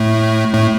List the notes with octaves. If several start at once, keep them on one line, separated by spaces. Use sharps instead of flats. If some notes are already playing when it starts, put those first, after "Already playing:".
Already playing: A2 A3
A2 A3